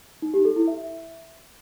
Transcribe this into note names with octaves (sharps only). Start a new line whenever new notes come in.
D#4
G4
A4
E4
E5